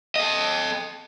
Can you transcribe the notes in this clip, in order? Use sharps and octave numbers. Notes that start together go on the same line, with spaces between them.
A4 D#5